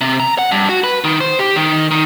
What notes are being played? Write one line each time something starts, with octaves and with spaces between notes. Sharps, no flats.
C3
A#5
F#5
G2
F#4
B4
D#3
C5
G4
D#3
D#3